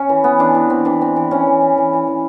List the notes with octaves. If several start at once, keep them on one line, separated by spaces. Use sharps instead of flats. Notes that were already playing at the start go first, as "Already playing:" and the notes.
Already playing: C#4
E3
B3
E3 D4
E3
C4
E3 D4
C4
E3
E3 C#4
E3
E3
E3
E3
E3